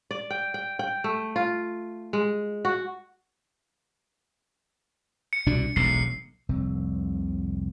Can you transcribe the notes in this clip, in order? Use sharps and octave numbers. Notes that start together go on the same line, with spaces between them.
D5
G5
G5
G5
A3
F4
G#3
F#4
C#7
C2 B2 D4
E1 B1 C7
F1 C2 C4